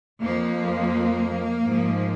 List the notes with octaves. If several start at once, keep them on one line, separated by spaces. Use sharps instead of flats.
F2 F3 A#3
G#2 F3